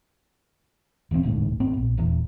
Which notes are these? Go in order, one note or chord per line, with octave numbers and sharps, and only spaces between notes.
D#1 E3 G3 C4
E1 A1 D2 G#2
G#1 B3 C4
A#1
D#1 E2